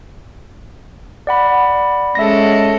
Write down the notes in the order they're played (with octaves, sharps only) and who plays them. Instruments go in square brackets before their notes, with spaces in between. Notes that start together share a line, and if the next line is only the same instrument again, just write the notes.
[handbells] D5 F#5 B5
[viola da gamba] G#3 C#4 A4 [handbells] E5 A#6